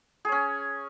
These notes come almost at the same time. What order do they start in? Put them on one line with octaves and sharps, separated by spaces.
G#4 C#5 C#4